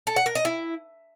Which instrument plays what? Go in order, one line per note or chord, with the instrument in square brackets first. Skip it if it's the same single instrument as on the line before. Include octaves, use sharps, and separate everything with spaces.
[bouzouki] A4
F#5
A#4
D#5
E4